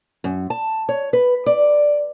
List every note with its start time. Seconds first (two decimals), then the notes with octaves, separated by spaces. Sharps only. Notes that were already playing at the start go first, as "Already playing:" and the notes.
0.24 F#2
0.50 A5
0.89 C#5
1.13 B4
1.46 D5